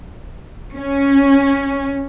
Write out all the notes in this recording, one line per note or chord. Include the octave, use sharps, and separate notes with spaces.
C#4